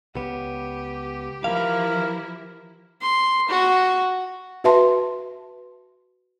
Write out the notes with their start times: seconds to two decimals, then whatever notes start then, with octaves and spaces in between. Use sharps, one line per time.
0.16 C#2 B3 G4
1.44 E3 F3 E4 A#4 F5
3.01 C6
3.49 F#4
4.64 F#4 B4 E5 A5 C6